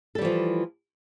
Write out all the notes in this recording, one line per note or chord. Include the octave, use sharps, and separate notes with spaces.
E3 F3 G3 A4